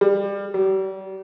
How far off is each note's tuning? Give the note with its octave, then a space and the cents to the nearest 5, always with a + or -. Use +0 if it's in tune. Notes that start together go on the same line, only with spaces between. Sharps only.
G3 +25
G3 -40